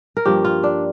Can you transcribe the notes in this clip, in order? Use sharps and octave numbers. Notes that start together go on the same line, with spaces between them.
A#4
G2 F3 A#3 G4
F4
D4